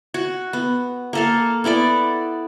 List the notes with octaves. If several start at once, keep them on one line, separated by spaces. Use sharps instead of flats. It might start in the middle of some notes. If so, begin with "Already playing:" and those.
F#4
B3
A#3 A4 F5
B3 E4 A4 D5